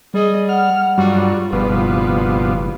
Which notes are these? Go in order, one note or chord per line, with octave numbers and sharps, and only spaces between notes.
G3 G#4 D#5
F#5 F6
G2 F#3 G3 F4
F#1 G2 B2 F3 B4